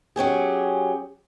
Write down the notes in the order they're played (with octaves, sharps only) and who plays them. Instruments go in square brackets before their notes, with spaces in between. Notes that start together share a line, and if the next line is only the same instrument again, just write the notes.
[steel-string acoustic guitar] F#3 C#4 G4 G#4